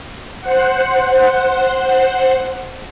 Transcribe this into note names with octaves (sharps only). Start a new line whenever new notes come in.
C5 F#5